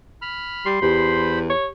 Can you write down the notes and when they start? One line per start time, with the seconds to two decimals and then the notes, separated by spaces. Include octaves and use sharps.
0.22 B5 F6
0.66 G3 C6
0.82 E2 G4 C5 B5
1.50 C#5